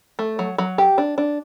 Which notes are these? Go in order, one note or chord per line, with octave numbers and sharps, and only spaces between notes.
A3
F#3
F#3
G4
D4
D4